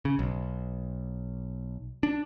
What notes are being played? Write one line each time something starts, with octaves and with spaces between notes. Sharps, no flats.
C#3
B1
D4